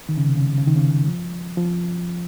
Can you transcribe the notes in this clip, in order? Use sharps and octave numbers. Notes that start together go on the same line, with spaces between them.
D#3
C#3
C3
C#3
C#3
D#3
C#3
F3
F3